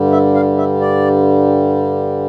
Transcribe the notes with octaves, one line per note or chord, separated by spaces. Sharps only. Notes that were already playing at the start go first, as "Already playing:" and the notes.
Already playing: G2 D3 G3
E5
F5
E5
D5